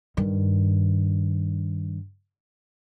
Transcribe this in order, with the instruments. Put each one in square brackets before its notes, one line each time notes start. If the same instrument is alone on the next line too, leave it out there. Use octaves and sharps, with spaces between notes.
[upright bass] G2 D#3